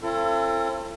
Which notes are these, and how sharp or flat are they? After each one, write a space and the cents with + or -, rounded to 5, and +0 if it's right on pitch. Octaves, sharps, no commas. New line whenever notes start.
C4 +30 F4 -45 A4 +30